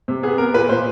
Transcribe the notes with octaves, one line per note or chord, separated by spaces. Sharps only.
C3
B3 G#4
B3 A#4
A#2 B4
A#2 C5